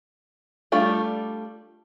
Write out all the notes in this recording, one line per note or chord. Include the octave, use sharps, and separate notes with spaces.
G3 A3 D4 F4 A4